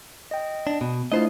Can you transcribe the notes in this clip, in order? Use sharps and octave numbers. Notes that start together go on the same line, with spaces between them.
D#5 G5
D4
B2
A3 D4 E4 F4 C5 D#5